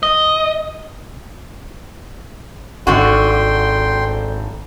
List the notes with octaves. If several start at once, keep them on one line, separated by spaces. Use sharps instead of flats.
D#5
G#1 G#2 D3 F#4 G5 C6